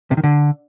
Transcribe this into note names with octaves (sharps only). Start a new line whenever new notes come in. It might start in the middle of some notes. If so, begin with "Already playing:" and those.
C3
D#3
D3